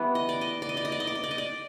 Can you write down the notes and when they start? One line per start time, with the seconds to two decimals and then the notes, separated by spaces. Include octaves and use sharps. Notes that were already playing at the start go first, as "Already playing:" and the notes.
Already playing: E3 G3 B3
0.15 D#5
0.29 D5
0.41 D#5
0.62 D5
0.69 D#5
0.77 D5
0.85 D#5
0.92 D5
1.00 D#5
1.07 D5
1.15 D#5
1.24 D5
1.31 D#5
1.38 D5